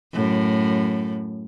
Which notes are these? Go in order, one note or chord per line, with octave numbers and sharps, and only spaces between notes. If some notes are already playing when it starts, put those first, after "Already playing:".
F#2 A2